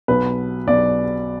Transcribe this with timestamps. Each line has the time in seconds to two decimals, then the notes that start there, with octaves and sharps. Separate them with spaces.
0.08 B1 B2 B4
0.67 B1 B2 D5